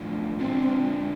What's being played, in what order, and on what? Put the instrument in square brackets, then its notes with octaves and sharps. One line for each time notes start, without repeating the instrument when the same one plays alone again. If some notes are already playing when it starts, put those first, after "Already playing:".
Already playing: [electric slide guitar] A2 F3 A3 D4 F4
[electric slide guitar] D3 G#3 D4 F4 [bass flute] C4
[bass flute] C4